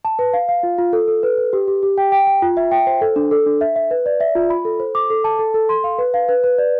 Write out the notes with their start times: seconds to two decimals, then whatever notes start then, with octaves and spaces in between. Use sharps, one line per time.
0.05 A5
0.19 B4
0.33 F5
0.49 F5
0.63 F4
0.78 F4
0.93 A4
1.08 A4
1.23 B4
1.37 B4
1.53 G4
1.68 G4
1.83 G4
1.98 G5
2.12 G5
2.27 G5
2.42 F4
2.57 E5
2.71 G5
2.87 C5
3.01 A4
3.16 D4
3.31 A4
3.46 D4
3.61 E5
3.76 E5
3.91 B4
4.06 D5
4.20 E5
4.35 F4
4.50 B5
4.65 A4
4.80 C5
4.95 D6
5.10 A4
5.24 A5
5.39 A4
5.54 A4
5.69 C6
5.84 F5
5.98 B4
6.14 F5
6.29 B4
6.44 B4
6.58 D5